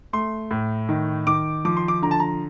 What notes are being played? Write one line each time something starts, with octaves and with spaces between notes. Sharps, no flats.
A3 C6
A2
D#3
D#3 D6
F3 D6
C6
D6
D3 A#5
A5
A#5